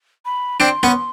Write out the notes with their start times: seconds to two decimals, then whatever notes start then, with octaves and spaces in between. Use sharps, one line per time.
0.25 B5
0.60 C4 D4 C6
0.83 B3 C#4